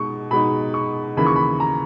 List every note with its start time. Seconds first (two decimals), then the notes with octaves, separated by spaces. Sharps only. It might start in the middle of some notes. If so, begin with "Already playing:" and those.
Already playing: B2 G#3 D#4 C#6
0.31 B2 G#3 D#4 B5
0.74 C#6
1.17 D#2 C#3 E3 A#3 B5
1.26 C#6
1.36 B5
1.60 A#5